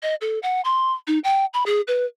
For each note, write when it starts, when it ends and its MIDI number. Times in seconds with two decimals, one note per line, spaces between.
0.03 0.15 75
0.21 0.39 69
0.43 0.61 78
0.65 0.93 84
1.07 1.19 63
1.24 1.45 79
1.54 1.63 83
1.66 1.81 68
1.88 2.05 71